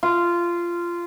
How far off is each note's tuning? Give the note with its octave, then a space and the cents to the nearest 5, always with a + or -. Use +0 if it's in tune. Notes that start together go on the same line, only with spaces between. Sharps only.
F4 -15